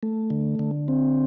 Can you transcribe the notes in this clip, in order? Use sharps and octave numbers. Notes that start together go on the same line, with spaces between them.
A3
D3
D3
C4